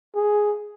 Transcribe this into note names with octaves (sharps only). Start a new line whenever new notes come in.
G#4